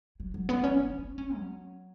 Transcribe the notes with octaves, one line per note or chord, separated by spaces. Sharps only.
F#3
F#3
B3
C#4
C#4
D#4
C#4
F#3